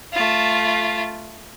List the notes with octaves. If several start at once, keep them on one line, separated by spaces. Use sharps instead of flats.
A3 F4